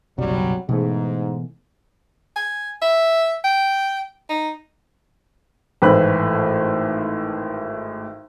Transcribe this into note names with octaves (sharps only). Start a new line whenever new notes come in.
F#1 B1 C3 F#3 G3
G#2 B2 E3 A3
G#5
E5
G5
D#4
G#1 A2 E3 A3 B5 F#6